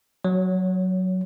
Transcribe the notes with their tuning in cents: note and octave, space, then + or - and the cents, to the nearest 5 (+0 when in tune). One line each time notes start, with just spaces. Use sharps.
F#3 +0 C#5 +20